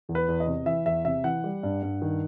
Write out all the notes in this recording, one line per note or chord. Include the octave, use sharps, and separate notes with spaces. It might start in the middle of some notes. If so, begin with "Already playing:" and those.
E2
B4
E2
D#5
C3
E3 E5
E2 E5
C3 E5
E3 F#5
G3
G2
G2
D#3